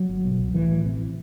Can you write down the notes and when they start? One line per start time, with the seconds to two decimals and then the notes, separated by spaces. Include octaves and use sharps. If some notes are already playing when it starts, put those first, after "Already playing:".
Already playing: F#3
0.09 G1
0.24 B2
0.39 C2
0.54 A2 E3
0.69 A1
0.85 C3